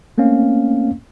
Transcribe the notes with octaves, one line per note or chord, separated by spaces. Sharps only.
A3 A#3 C4 C#4 F5